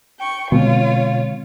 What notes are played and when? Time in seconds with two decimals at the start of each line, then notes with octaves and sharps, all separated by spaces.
0.19 G5 C#6
0.52 B2 D3 G#3 C4 F4 C#5